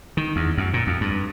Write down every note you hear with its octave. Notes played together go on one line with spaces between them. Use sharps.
D#3
E2
F#2
A#2
F2
G2